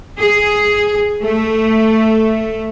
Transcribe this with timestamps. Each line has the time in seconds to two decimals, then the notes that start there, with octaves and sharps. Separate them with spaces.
0.20 G#4
1.23 A3